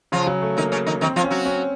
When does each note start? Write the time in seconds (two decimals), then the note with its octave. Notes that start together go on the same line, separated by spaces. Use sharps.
0.12 C#3 F3 F4
0.27 F#3
0.42 A3
0.57 D#3 A#3 D#4
0.72 C#3 C#4
0.86 D#3 D#4
1.01 D#3 C4 D#4
1.16 F3 F4
1.24 C#4
1.31 F#3 F#4
1.45 C#4